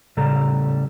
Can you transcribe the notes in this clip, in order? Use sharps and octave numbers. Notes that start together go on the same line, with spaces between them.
A2 C#3 G3 A4 A#5